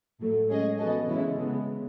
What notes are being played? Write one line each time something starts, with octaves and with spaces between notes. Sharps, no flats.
A2 F#3 A3
G#3 C#4 G#4 D#5
E3 B3 F#4 A4 D#5
C#3 E3 G#3 C#4 E4
C#3 G#3 B3